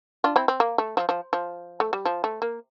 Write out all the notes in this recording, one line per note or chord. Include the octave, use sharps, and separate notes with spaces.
D4 F4
C4 E4
C4
A#3
A3
F3
F3
F3
A3
G3
F3
A3
A#3